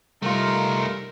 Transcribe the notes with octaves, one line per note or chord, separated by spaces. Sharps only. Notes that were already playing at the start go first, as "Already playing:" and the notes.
C2 G3 A3 D#4 F4 A#4